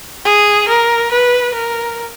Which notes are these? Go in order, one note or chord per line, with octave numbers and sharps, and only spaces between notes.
G#4
A#4
B4
A#4